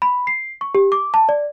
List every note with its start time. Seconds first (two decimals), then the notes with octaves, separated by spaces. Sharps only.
0.02 B5
0.27 C7
0.61 C#6
0.75 G4
0.92 D6
1.14 A5
1.29 D5